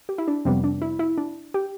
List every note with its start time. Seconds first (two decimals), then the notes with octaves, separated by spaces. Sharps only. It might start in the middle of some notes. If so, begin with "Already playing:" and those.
0.09 G4
0.18 E4
0.28 D4
0.45 F2 C3 G3 B3 C4
0.64 D4
0.82 E4
0.99 E4
1.18 D4
1.54 G4